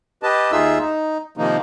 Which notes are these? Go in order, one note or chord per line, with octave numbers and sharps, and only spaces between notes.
G4 B4 D#5 A5
D#2 D#4 F4 G#4 E5 E6
D#4
C3 D#3 F3 A#3 D#4